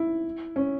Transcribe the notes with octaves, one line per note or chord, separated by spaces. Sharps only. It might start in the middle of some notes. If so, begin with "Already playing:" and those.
Already playing: E4
C#4